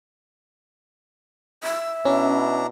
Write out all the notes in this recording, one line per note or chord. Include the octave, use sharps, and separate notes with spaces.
E5 E6
B2 C#4 D4 E4 A#5